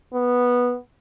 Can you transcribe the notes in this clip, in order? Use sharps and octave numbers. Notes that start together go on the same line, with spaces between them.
B3